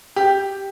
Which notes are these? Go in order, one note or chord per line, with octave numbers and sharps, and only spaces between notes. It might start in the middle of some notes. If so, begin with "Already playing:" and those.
G4